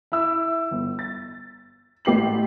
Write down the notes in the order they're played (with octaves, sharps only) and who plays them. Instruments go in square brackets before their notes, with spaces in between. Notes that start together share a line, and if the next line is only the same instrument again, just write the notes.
[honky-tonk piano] E4 E6
G1
A6
A1 G4 C7 F#7